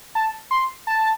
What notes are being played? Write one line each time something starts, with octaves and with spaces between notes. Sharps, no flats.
A5
C6
A5